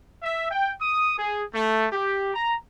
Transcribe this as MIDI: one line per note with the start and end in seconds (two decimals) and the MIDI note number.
0.22 0.50 76
0.51 0.72 79
0.81 1.15 87
1.17 1.42 68
1.53 1.86 57
1.92 2.33 67
2.34 2.55 82